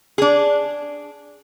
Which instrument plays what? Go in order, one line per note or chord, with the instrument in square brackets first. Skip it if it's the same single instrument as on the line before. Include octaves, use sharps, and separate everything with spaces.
[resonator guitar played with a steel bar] D4 G#4